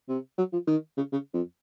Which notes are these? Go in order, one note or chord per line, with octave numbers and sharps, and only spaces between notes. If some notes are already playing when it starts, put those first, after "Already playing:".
C3
F#3
F3
D#3
C#3
C#3
F2